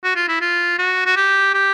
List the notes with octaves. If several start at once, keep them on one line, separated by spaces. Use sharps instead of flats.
F#4
F4
E4
F4
F#4
F#4
G4
G4